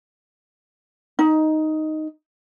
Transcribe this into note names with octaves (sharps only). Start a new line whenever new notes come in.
D#4